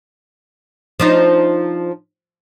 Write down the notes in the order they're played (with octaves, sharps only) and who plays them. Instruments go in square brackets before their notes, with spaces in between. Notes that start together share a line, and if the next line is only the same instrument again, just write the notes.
[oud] F3 D4 D#4